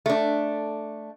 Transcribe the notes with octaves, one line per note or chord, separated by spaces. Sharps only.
A3 D4